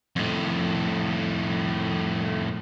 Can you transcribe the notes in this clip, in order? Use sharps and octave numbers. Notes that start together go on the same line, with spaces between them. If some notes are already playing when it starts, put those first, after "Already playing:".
F2 A2